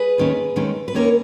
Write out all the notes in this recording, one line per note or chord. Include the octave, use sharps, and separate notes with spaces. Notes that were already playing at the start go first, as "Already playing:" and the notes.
Already playing: G#4 B4
D#2 D#3 G#3 C#4
D#2 D#3 G#3 C#4
B4
D#2 D#3 A#3 C#4 A#4 C#5